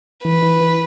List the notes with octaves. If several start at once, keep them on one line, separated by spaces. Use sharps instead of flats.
E3 B4
E3
E3